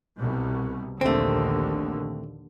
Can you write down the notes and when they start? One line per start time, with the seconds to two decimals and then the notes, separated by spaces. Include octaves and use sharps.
0.18 C2 B2
1.01 A#1 D#2 D3 A3 C4